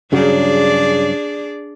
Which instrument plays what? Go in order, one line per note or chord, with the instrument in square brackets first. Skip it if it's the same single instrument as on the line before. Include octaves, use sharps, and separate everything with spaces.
[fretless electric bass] G2 C#3 F#3 [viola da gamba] D4 G#4 D5